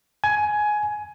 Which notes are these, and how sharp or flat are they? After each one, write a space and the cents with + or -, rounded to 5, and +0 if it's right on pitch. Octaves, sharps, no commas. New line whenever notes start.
G#5 +15